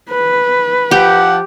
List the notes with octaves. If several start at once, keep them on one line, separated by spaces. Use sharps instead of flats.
B4
F3 G4 F#5